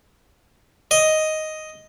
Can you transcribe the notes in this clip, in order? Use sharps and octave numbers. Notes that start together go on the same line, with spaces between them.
D#5